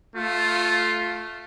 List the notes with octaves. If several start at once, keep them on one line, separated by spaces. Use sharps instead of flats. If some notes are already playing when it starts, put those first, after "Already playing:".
A3 F4